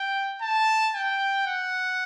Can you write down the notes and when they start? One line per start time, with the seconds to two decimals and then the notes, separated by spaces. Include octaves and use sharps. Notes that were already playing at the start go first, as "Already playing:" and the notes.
Already playing: G5
0.42 A5
0.95 G5
1.47 F#5